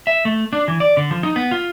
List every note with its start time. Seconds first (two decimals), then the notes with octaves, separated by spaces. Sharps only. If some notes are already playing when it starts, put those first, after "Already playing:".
0.07 E5
0.25 A3
0.53 D4
0.68 E3
0.80 D5
0.97 D3
1.11 F3
1.23 D#4
1.36 B3
1.51 F4